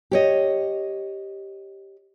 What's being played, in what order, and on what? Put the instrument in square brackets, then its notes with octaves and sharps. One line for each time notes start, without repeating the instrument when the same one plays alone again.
[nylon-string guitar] G4 C#5 D#5